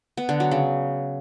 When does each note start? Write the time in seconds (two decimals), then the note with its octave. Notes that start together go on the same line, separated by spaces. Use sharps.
0.17 B3
0.29 D3
0.40 F#3
0.51 C#3